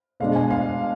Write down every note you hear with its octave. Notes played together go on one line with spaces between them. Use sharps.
B2 G#3 D4 F5
G#5
F5